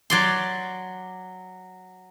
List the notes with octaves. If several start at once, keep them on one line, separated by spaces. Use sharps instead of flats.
F#3 D5 C6